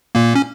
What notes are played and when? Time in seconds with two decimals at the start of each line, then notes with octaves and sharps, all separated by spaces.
0.15 A#2 A#3
0.35 C#4